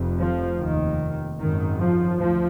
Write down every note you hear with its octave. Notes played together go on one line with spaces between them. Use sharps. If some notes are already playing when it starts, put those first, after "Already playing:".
Already playing: F1 F2
F3
F1 D#2 D#3
G#1 F#2 D#3
F3
D2 F3